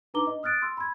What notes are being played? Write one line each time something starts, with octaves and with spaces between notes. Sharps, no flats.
D4 D#4 B4 A#5 D6 G7
D#5
D#6 F6 F#6 A6 D7
C6 E6
B5 G#6